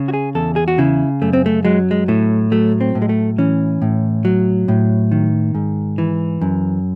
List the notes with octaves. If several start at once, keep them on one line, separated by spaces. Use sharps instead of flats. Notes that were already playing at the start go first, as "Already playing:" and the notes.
Already playing: C#3
F#4
G#4
E2 A4
G#4
F#4
C#3 E4
F#2 A3
C4
A3
F#3 G#3
G#3
A2 A3
F#3 A3
C4
A2
G#3
A3
E3 C#4
A2
F#3
A2
D#3
G#2
E3
F#2